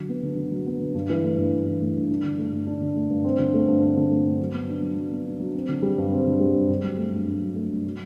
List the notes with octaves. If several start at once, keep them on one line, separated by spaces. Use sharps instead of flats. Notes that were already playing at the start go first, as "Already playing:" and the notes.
Already playing: D3 F#3
B3
D3
D3
F#3
B3
D3
G2
E3
A3
G2
G2
E3
A3
G2
D4
D3
A3
G2
D4
D3
A3
G2
C4
D3
A3
G2
C4
D3
A3
G2
F#3
B3
D4
F#3
F#3
B3
D4
F#3
C4
D3
G3
G2
C4
D3
G3
G2
G2
F#3
A3
G2
G2
F#3
A3
G2
F#3